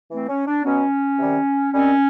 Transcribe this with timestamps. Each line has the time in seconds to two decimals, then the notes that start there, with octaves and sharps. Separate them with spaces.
0.11 E3 A3 C4
0.29 C#4
0.47 D4
0.64 B2 F#3 B3 C#4
1.19 C3 D#3 G3
1.73 D#3 G3 C4 C#4